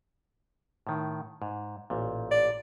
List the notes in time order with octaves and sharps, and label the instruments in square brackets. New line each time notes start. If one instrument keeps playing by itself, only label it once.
[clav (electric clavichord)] A2 D#3
G#2
A1 A#2
[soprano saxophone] D5